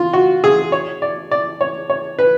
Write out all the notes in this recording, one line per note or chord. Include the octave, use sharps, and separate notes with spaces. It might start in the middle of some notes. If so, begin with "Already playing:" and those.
Already playing: F4
F#4
G#4
C#5
D5
D5
C#5
C#5
B4